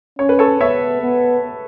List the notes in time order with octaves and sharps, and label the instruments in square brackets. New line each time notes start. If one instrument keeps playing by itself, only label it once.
[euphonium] C#4 [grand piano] C#5
[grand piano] B4
A4 C#5
[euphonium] B3 [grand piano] C#5 E5
[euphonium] B3